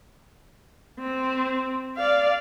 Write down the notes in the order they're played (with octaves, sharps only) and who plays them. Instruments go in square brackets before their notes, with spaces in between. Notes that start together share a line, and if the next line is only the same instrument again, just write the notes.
[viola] C4
D5 F5